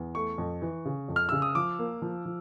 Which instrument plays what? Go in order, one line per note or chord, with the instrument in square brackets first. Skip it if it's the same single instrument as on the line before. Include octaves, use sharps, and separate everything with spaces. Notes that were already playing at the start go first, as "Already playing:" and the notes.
Already playing: [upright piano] E2
[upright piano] A3 [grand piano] C#6
[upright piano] F2
E3
C#3
F2
[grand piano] F6
[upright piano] C#3 [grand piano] E6
[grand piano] D#6
[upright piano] F3 [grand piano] D6
[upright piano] A#3
F3
F3